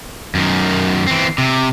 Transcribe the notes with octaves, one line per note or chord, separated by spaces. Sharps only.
F#2 D#3
E3 C4
C3